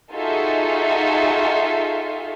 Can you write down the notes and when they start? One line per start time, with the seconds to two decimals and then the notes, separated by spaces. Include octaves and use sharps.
0.11 D#4 F4 F#4 G#4 A4 E5